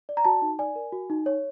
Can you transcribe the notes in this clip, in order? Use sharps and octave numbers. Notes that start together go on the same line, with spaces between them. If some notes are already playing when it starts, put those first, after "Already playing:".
D5
A#5
F#4 A5
D#4
D5 G#5
A#4
F#4
D#4
C#5